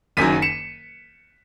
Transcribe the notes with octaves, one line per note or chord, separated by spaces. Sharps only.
F#1 F#2 D#3 F#3 B6 D#7
C#7 E7